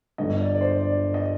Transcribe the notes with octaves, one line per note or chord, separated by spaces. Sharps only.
G1 G2 D3 D#5
D5
D5
C5
D5
D#5